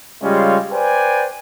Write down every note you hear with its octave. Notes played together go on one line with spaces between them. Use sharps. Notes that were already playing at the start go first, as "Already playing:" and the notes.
C#3 G3 G#3 C#4 F4 F5
B4 C5 D5 G5 G#5